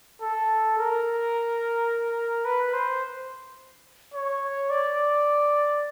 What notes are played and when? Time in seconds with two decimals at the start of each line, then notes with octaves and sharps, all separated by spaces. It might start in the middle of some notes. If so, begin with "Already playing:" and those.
0.21 A4
0.78 A#4
2.45 B4
2.74 C5
4.14 C#5
4.70 D5